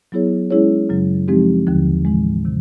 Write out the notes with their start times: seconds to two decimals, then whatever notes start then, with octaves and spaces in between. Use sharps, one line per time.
0.12 F#3 B3 E4 G#4 C#5
0.50 G#3 C#4 E4 G#4 C#5
0.89 F#2 C#3 F#3
1.28 F3 G#3 C4 D#4 G4
1.67 D#2 D3 F3
2.05 A2 E3 G#3
2.45 C3 D#3